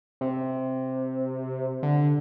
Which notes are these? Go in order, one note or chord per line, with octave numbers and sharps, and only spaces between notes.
C3
D3